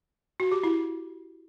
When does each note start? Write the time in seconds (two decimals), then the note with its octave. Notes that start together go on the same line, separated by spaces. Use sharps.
0.40 F#4
0.52 G4
0.63 E4